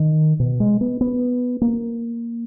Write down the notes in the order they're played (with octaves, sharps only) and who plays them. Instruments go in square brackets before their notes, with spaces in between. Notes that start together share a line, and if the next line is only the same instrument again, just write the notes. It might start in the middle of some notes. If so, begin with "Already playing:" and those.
Already playing: [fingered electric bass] D#3
B2
G#3
B3
B3
A#3